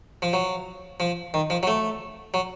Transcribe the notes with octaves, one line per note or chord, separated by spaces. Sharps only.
F3
F#3
F3
D#3
F3
F#3
A3
F#3